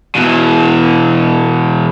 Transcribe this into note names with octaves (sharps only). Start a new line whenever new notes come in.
B2 E3